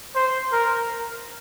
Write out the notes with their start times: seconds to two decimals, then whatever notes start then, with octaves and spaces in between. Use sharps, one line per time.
0.16 C5
0.52 A#4